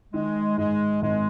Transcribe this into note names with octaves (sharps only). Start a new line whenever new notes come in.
D#3 G#3
G#2 G#3
G#1 G#3